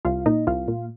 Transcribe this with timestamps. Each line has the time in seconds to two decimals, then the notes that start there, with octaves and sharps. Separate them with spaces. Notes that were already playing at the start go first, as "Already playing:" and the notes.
0.05 C2 F4 F5
0.26 A#2 D#4 D#5
0.47 C2 F4 F5
0.68 A#2